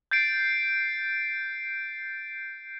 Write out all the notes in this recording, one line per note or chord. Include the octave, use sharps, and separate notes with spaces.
G6 A6 C7 D7